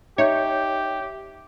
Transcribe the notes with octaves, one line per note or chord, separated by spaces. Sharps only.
D#4 G4 C#5 E5 G6